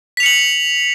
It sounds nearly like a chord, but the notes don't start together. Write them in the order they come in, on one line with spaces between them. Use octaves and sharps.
B6 F7 C#7 F#7